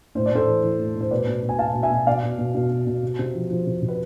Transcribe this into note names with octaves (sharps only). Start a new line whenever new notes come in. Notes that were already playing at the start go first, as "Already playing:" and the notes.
A2 C5
D5
A2 A4 C5
E3
E3
A2
A2
C5
B2 B4 D5
B2
B2
G#5
B2 F5 A5
B2
E5 G#5
B2
B2 D5 F5
B2
B2
B2
B2
B2
C3
C3
F3
F3
C3
C3
B4